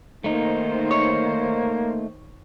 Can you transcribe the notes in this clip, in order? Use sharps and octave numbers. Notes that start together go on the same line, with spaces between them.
D#3 A3 A#3 D#4 C5
C#5